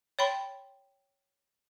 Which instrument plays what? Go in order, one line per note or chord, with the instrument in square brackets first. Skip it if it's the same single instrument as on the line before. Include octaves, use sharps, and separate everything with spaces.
[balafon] C#5 G5 B5 C6